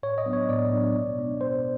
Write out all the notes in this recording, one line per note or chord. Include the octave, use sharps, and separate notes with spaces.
A2 C#5
D#5
F#3 B3 D4
C#5
A2 D5
F#3 B3 D4
B2
G#3 B3 D4
B2 C5